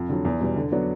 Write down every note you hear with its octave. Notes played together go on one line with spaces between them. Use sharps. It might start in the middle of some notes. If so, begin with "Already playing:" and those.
Already playing: F2
D3 F#3
E2
B2 G3
D3
F#3 B3 D4